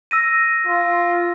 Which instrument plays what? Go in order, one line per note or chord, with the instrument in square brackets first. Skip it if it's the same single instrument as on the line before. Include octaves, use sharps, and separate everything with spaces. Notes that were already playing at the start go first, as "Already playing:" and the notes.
[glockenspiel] E6 A#6 D#7
[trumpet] F4